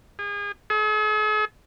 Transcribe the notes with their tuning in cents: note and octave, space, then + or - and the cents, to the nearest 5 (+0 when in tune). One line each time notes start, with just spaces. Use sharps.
G#4 -35
G#4 +45